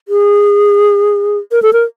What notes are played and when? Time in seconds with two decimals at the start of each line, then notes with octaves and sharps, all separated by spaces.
0.08 G#4
1.52 A#4
1.62 A4
1.73 A#4